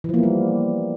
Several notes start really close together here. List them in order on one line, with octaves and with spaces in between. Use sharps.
E3 F3 A#3 B3 G3